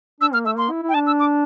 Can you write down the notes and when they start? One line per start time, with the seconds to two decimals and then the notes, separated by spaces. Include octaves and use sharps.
0.20 D4 E6
0.33 A#3 F6
0.46 A3 E6
0.57 A#3 C6
0.70 E4
0.82 E4
0.89 G5
0.94 D4 A5
1.07 E6
1.20 D6